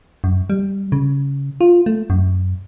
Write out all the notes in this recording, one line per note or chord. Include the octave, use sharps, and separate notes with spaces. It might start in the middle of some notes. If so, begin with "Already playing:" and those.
F#2
G3
C#3
F4
A3
F#2